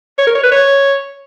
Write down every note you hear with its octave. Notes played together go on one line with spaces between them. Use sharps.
C#5
A#4
C#5
B4
C#5